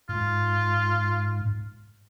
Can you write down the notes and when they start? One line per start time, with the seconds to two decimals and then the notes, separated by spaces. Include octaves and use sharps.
0.09 G#2 F4